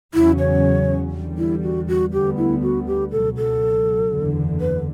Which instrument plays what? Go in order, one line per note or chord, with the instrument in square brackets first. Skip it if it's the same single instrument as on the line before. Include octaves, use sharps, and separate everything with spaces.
[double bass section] E2 C#3 F#3 C#4 [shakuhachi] E4
[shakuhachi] C#5
[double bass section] E2 D3 G3
[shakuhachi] E4
F#4
F#4
[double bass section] D2 D3 G3 B3 [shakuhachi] G4
[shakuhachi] E4
F#4
G4
[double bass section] C#2 B2 F#3 [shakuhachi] A4
[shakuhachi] A4
[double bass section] F#1 E2 D3
[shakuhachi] B4